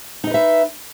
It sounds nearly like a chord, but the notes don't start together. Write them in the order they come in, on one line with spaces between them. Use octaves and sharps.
D#4 D#5 B4 E5